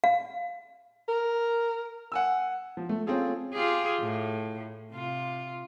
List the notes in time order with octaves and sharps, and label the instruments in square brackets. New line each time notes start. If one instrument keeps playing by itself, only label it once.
[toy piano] F5
[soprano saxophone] A#4
[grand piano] F#5 G#5 E6
F3
A3
C4 C#4 F4 G#4 A4
[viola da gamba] F4 G4 G#4
A2
C3 F4